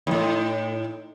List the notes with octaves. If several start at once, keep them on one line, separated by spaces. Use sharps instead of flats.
D#2 A2